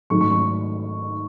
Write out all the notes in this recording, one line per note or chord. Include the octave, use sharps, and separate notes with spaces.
G#2 D#3 F#3 A3 C#6
C#6
C#6